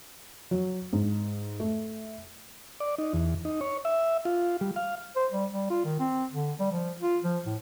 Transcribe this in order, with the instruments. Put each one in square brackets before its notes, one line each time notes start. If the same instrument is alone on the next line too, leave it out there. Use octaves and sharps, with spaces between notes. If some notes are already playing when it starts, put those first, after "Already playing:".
[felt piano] F#3
G#2
A3
[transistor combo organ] D5
D#4
E2
D#4
C#5
E5
F4
G3
F5
[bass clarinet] C5
G3
G3
F4
D#3
C4
D3
G3
F3
F4
F3
A2